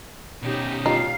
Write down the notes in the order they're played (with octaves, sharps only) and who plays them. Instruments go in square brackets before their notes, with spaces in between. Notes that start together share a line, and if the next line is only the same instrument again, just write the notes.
[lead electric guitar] B2 C#4 [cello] D#4 G4
[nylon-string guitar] G3 F4 G4 [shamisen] D#4 [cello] F5